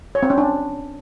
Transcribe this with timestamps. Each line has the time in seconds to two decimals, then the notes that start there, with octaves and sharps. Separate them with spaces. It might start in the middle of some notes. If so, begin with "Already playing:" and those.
0.15 C#5
0.23 C4
0.30 C#4
0.38 D4